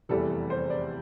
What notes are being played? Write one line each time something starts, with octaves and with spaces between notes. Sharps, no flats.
F1 E2 E3 G3 A4
A4
C5
D5